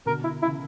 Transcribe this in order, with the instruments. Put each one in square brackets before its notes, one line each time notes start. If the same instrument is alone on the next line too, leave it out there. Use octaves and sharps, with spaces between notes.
[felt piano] B2 D3 [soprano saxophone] A#4
[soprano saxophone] E4
[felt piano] C#3 E3 [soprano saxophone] E4